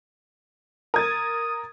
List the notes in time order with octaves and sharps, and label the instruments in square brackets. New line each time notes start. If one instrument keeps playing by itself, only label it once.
[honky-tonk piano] A#4 G#6 A6 [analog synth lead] D#6